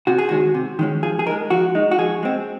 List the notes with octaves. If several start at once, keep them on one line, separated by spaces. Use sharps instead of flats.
C3 F#4
G#4
D#3 G#3 C#4 F#4
C3
D#3 G#3 C#4
F3 G#4
G#4
G#3 D#4 A#4
F3 F#4
G#3 D#4
F#4
F3 G#4
G#3 C4